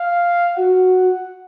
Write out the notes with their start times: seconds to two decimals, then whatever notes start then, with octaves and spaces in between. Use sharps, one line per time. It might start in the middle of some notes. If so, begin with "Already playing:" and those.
Already playing: F5
0.56 F#4 F#5